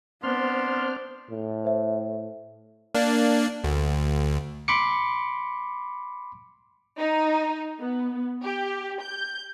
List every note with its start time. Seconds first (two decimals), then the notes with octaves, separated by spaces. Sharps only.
0.23 B3 C4 D4 C5 C6 F6
1.30 A2
1.65 C5 E5
2.95 A#3 D4
3.64 D2
4.68 B5 C6 D6 C#7
6.99 D#4
7.80 B3
8.44 G4
9.01 G6